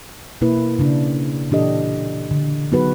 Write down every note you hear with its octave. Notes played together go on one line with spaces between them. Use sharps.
B2 A#3 E4 B4
C#3 D4
A#2 E3 D4 G4 A4 D#5
D3
F#3 B3 D#4 F#4 G#4 B4